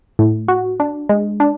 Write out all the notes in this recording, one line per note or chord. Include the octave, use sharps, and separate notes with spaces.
A2
F#4
D4
G#3
D4